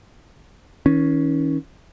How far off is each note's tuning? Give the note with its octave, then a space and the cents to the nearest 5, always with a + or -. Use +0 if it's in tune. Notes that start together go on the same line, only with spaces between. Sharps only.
D#3 +40 C#4 +0